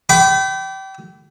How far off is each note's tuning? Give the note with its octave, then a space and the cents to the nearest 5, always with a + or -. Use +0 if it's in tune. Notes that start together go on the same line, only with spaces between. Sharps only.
G5 -30 B5 +25 D6 -25